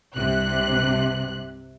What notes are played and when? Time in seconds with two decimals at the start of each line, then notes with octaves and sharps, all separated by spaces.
0.16 C2 G2 C3 F#6